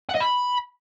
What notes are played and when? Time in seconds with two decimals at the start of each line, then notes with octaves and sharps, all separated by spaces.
0.10 F#5
0.15 D#5
0.21 B5